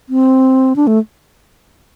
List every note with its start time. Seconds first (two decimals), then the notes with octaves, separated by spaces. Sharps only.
0.09 C4
0.76 D4
0.87 A3